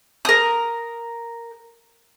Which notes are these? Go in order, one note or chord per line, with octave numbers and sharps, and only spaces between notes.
A#4 D#6